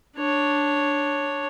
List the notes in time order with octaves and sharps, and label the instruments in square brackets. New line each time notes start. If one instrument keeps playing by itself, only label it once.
[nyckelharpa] D4 C#5